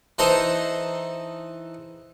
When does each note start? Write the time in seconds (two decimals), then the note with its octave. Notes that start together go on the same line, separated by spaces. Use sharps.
0.18 E3 D#4 A4 C5 A#5 C6